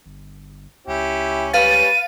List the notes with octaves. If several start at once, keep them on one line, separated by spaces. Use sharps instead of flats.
G1
C#2 C#4 E4 G4
G3 C#4 B4 F5 A6 D#7